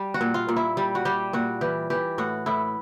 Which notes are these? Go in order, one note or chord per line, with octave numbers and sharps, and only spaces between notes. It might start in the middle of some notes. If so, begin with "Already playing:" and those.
Already playing: G3
F#4
A#2
F4
A#2
E4
G3
F#4
G3 G4
A#2 F#4
E3 G4
E3 G4
A2 F#4
A2 E4